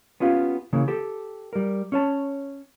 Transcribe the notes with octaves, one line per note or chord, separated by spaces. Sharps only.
B3 C#4 F4 G4 F5
C#3 E3 A#3
G4 A4
G3 A#4
C#4 C#5 A5